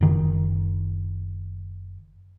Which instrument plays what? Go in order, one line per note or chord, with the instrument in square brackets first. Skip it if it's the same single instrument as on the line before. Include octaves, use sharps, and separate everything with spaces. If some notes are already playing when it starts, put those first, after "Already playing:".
[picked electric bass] F#1 D#3